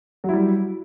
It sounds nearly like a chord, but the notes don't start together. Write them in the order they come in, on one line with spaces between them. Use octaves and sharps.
F#3 E4 G3